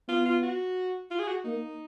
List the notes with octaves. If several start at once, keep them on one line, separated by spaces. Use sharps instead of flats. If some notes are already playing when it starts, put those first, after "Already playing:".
B3 F4
F4
F#4
F4
G#4
F#4
A#3 D#4